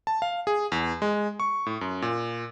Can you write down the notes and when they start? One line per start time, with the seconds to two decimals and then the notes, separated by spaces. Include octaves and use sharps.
0.07 A5
0.22 F5
0.47 G#4
0.72 E2
1.02 G#3
1.40 C#6
1.66 A2
1.81 F#2
2.02 A#2